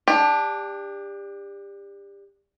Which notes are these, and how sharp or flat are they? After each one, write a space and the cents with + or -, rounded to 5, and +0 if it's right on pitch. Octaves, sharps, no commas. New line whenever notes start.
D4 +0 G4 +30